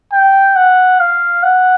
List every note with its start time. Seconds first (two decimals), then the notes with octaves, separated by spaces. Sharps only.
0.12 G5
0.56 F#5
1.00 F5
1.43 F#5